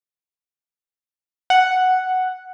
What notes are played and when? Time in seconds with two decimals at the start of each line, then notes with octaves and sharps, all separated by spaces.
1.50 F#5